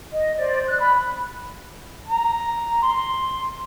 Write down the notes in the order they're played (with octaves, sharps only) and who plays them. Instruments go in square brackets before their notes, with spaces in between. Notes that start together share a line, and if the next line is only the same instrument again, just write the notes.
[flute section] D#5
C5 D5
F#6
B5
[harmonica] A#5
C6